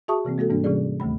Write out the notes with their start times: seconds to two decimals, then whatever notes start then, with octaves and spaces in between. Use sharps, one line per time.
0.08 F#4 G#4 E5 A5 C#6 D#6
0.25 C3 E3 A#3 C4
0.38 G#3 A#3 F#4 A4
0.50 G#2 E3 G3 A#3 D4
0.64 C3 E3 G3 C#4 G#4 D5
1.00 D2 D#3 A3 B5